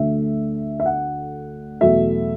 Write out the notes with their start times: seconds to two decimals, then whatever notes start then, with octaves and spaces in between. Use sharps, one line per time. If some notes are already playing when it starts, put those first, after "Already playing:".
Already playing: D2 D3 A3 E5
0.80 E5
0.86 F#5
1.81 E2 B2 F#3 A3 E5